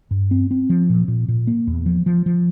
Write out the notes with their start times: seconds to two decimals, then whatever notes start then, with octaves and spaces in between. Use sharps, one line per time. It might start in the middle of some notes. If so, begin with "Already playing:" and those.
0.11 G2
0.31 C4
0.51 C4
0.70 F3
0.90 A#2
1.08 A#2
1.28 A#2
1.47 A#3
1.67 E2
1.86 F3
2.06 F3
2.26 F3